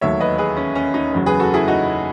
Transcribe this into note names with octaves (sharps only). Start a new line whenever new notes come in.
E1 D#2 D#3 F#3 A3 C#5 E5
B4 D#5
G#4 B4
C#4
C#4
D#4
F#1 E2 C#3 F#3
G#4 B4
F#4 A4
E4 G#4
D#4 F#4